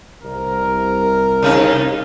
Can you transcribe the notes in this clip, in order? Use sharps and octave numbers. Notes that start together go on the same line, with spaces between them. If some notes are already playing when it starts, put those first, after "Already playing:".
C2 A#4
C3 D#4